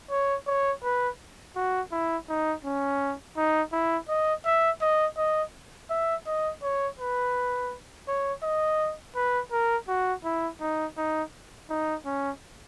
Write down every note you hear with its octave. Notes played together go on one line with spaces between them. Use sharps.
C#5
C#5
B4
F#4
E4
D#4
C#4
D#4
E4
D#5
E5
D#5
D#5
E5
D#5
C#5
B4
C#5
D#5
B4
A#4
F#4
E4
D#4
D#4
D#4
C#4